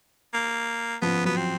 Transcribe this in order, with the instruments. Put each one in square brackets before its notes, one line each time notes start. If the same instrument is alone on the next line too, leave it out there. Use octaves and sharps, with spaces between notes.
[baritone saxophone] A#3
[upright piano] F3 [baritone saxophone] B3
[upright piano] F#3 [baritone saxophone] B3
[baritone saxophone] C4